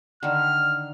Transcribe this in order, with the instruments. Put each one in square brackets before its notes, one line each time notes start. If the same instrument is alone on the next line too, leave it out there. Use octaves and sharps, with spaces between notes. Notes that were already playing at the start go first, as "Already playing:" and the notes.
[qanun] D3 D#3 [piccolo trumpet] F6